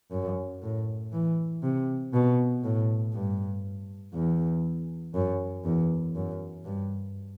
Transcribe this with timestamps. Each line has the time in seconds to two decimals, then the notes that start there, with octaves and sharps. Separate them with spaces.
0.12 F#2
0.62 A2
1.13 E3
1.63 C3
2.13 B2
2.63 A2
3.13 G2
4.14 E2
5.14 F#2
5.65 E2
6.15 F#2
6.65 G2